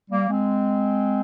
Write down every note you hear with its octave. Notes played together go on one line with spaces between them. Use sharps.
G3 A#3
G#3 C4